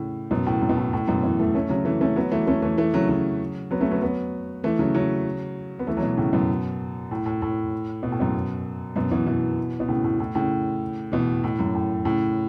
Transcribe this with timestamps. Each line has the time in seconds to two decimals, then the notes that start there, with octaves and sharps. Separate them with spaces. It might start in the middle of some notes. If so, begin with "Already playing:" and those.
Already playing: A2 C#3
0.31 F#2 B2
0.47 A2
0.61 F#2
0.69 B2
0.77 A2
0.93 A2
1.08 F#2 B2
1.23 B2 E3
1.40 E3 A3
1.55 A3 C#4
1.70 C#3 F#3
1.85 E3 A3
2.01 A3 C#4
2.16 F#3 B3
2.32 E3 A3
2.47 A3 C#4
2.62 E3 A3
2.78 E3 A3
2.94 C#3 F#3
3.09 C#3 F#3
3.71 F#3 B3
3.81 A3 C#4
3.91 F#3 B3
4.01 F#3 B3
4.64 E3 A3
4.79 C#3 F#3
4.95 C#3 F#3
5.79 B3
5.87 E3 A3
5.97 F#3
6.02 B2 E3
6.17 A2 C#3
6.33 F#2 B2
7.11 A2
7.26 A2
7.42 A2
8.03 B2
8.12 A2
8.20 F#2 B2
8.96 F#2 B2
9.11 B2 E3
9.26 B2 E3
9.80 B2
9.88 A2 C#3
10.04 A2
10.20 A2
10.35 A2 C#3
11.12 B2 E3
11.44 A2
11.59 F#2
11.75 A2
12.05 A2 C#3